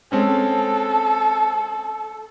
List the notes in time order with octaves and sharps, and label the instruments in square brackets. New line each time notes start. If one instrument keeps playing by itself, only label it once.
[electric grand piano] G#3 C4 C#4 [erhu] A4